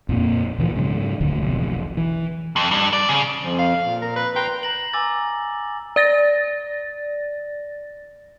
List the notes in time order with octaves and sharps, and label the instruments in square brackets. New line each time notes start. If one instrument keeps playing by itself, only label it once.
[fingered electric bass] F2 A#2 A#3
C#2 A#2 E3 F3
G#2 C#3 F#3
D#1 D2 D3 A3
E1 B1 F2
E3
[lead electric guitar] F2
G2
D5
C#3
[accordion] F2 F3
[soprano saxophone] F5
[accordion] A#2
[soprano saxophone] A#4
B4
[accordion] B4 A#5 C6 [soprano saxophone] G5
[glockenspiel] A#5 A#6 F#7
G#5 A#5 D6 E6 A6
[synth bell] D5 A6 A#6